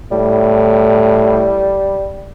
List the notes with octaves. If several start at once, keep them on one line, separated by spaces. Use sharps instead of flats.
A2 G3